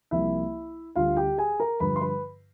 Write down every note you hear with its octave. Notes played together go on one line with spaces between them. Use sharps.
C2 C3 F3 A#3 E4 E5
D2 D3 G3 F4 F5
G4 G5
G#4 G#5
A#4 A#5
G2 D3 F3 B4 B5
C6
B4 B5